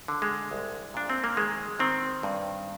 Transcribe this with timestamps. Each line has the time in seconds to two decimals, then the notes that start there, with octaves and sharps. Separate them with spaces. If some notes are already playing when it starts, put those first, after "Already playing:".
0.08 D3
0.22 G#3
0.51 C2
0.94 A#2 D4
1.10 C4
1.24 A#3
1.36 D#3 G#3
1.79 D#3 C4
2.23 G2